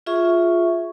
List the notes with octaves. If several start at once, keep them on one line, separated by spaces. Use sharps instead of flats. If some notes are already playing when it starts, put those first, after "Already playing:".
F4 G#4 E5 C#6